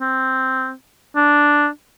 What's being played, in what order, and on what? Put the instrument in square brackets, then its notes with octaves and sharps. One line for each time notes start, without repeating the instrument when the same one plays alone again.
[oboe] C4
D4